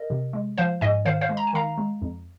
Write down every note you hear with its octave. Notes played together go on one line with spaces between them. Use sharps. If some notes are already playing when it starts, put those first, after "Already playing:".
Already playing: A#4 D#5
C3
G#3
F3 C5 F5
G#2 D#5 G#5
D#3 C5 F5
C5 F5
G#3
A#5
G#5
D#3 F5 A#5
G#3
F2